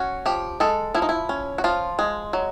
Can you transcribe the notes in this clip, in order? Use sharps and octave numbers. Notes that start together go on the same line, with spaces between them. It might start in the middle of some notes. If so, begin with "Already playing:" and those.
Already playing: C#4 F#4
F3 G4
G#3 A4
F3 E4
D#4
E4
C#4
F#4
F3 F4
G#3
F#3